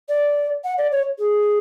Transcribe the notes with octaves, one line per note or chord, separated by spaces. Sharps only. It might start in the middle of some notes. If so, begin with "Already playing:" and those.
D5
F#5
D5
C#5
G#4